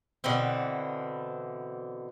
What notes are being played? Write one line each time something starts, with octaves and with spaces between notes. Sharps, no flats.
B2 D3 E3 C4